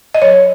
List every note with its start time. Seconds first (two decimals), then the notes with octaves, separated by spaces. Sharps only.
0.15 D#5
0.22 F#3 C#5